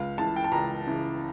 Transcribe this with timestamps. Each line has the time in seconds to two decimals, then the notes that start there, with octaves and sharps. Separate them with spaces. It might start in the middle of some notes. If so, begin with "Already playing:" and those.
Already playing: C#2 F5
0.18 C#3 E3 A5
0.36 G5
0.44 A5
0.52 C#2 A#5
0.86 C#3 E3